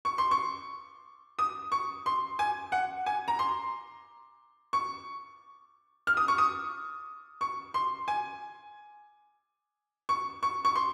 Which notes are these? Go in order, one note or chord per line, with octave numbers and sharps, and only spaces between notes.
C#6
C6
C#6
D#6
C#6
C6
G#5
F#5
G#5
A#5
C6
C#6
F6
D#6
C#6
D#6
C#6
C6
G#5
C#6
C#6
C#6
C6